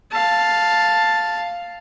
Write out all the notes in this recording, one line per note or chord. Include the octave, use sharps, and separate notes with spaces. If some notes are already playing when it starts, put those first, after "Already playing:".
F5 A5